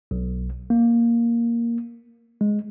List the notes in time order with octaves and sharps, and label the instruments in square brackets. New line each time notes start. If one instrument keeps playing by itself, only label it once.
[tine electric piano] B1
A#3
G#3